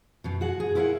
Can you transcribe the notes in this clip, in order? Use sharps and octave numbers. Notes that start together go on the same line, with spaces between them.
F#2 B2
F#4 G#4 F#5
G#4
E4 A#4 B4 D#5 F5 F#5